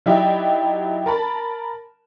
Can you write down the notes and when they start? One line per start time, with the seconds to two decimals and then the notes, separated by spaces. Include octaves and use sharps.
0.06 F#3 D#4 E4 G4 D5
1.06 A#4 A5 B5